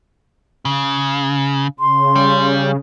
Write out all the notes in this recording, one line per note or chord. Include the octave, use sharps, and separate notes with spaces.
C#3
C#3 C6
G3